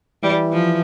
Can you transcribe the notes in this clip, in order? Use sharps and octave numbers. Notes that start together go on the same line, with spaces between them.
E3 G3
F3